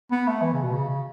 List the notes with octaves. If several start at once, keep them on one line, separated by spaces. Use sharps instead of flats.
B3
A3
E3
C#3
B2
C#3
C#3